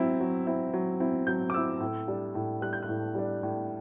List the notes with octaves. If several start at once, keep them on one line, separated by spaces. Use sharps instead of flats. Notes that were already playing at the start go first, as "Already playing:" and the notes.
Already playing: F#3 C4 E4
F#3
C4 E4
F#3
C4 E4
F#3 G6
D6
C4 E4 E6
A2
G3 D4
A2
G3 D4 F#6
G6
F#6
A2
G3 D4
A2